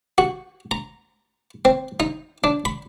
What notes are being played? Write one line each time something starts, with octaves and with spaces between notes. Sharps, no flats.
F#4
A#5
C4
D#4
D4
B5